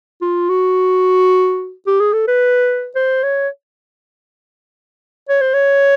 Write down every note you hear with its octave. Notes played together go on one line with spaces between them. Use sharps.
F4
F#4
G4
G#4
A4
B4
C5
C#5
C#5
C5
C#5